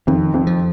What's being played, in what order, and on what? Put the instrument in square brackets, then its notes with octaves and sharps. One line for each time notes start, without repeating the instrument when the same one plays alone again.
[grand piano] F2 [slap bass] D#3
[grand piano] F2
[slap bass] F3